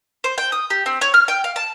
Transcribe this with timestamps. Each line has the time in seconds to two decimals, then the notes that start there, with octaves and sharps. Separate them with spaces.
0.24 C5
0.38 G5
0.52 D#6
0.70 G4
0.86 C4
1.01 C#5
1.14 F6
1.28 G5
1.44 F5
1.56 A5